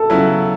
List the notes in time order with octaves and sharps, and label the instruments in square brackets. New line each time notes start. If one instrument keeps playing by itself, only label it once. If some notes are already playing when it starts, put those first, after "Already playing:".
Already playing: [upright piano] A4
[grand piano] C#3 F#3 B3 E4